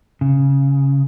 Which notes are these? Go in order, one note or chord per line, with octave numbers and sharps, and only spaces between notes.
C#3